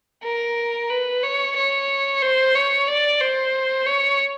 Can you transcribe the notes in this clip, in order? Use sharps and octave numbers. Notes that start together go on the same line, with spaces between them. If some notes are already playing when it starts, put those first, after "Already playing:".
A#4
B4
C#5
C#5
C5
C#5
D5
C5
C#5